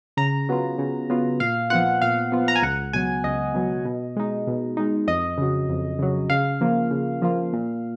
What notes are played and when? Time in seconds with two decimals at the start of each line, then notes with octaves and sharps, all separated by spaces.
0.17 C#3 A#5
0.49 F#3 B3 F4
0.79 C#3
1.10 F#3 B3 F4
1.40 A#2 F5
1.70 F3 B3 F4 F#5
2.02 A#2 F5
2.32 F3 B3 F4
2.48 A#5
2.56 G#5
2.62 C#2 F#5
2.93 B2 F#3 G#5
3.24 C#2 D#5
3.54 B2 F#3
3.85 B2
4.16 G#3 D#4
4.47 B2
4.77 G#3 D#4
5.07 F2 D#5
5.38 C#3 F#3
5.69 F2
5.99 C#3 F#3
6.30 C#3 F5
6.61 F3 A#3 F4
6.91 C#3
7.22 F3 A#3 F4
7.53 A#2